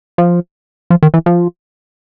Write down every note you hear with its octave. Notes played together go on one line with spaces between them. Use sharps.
F3
F3
D#3
E3
F3